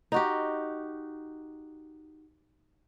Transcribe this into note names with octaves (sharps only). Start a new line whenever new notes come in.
D#4 F#4 G4